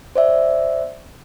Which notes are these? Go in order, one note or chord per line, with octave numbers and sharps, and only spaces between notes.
C5 D5 E5